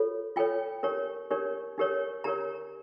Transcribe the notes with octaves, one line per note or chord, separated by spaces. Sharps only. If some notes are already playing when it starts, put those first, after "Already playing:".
Already playing: F4 A4 C#5
F4 A4 C#5 G5
D4 G4 A#4 C#5
D4 G4 A#4 C#5
D4 G4 A#4 C#5
D4 G4 A#4 C#5 A#5